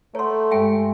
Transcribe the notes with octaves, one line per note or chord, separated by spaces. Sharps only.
A3 C#5 F#5 A#5 C6
G2 G#3 E5 G5 G#5